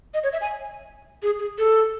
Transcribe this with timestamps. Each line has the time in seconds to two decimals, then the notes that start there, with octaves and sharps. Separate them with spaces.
0.14 D#5
0.23 C#5
0.33 E5
0.41 G#5
1.23 G#4
1.39 G#4
1.58 A4